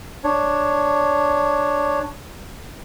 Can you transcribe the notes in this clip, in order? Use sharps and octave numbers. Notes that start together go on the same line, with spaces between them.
D4 C#5